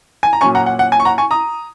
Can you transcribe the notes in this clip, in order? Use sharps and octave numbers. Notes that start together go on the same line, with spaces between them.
G#5
A#5
A#2 F#3 C#4 G#5 C#6
F#5 A#5
F#5
F#5
G#5
C#6
F#5 A#5
G#5 C#6
A#5 D#6